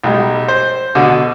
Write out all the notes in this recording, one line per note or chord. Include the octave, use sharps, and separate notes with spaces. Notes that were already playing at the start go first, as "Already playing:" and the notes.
B1 G3 G#3
C5
B2 D3